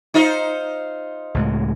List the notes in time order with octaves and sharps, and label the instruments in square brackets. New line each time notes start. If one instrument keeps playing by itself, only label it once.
[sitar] D#4 F4 C5
[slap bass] C#2 A2 G#3